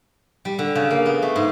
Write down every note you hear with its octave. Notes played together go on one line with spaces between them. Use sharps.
G3
D3
C#3
A#3
B3
A3
G#2